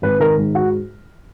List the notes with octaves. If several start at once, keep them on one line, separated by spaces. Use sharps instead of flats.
G#1 B4
D#3 A#4
G#2
F#4